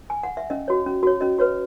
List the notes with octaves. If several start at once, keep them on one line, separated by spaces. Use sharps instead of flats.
G#5
F#5
E5
C#4 D#5
F#4 C#5
C#4
F#4 C#5
C#4 D#5
F#4 B4 C#5